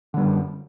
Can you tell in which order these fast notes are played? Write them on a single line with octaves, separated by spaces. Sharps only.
D3 G3 F#2